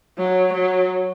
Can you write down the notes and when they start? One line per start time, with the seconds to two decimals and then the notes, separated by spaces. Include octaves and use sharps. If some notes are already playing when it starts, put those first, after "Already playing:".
0.18 F#3
0.54 F#3